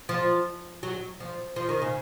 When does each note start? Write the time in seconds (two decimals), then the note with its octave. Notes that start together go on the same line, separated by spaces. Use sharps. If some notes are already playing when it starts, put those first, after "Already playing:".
0.09 F3
0.83 F#3
1.20 F3
1.56 F3
1.69 D#3
1.82 C#3